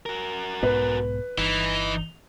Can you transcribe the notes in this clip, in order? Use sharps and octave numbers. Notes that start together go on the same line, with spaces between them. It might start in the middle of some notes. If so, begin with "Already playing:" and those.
F#4 A#4
B1 G#2 B3 B4
G1 E3 D#4